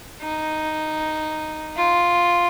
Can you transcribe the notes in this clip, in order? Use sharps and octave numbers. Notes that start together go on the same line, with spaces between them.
D#4
F4